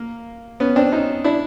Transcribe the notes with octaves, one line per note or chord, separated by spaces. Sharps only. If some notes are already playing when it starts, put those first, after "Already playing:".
Already playing: A#3
B3 C#4
C4 D4
C#4 D#4
D4 E4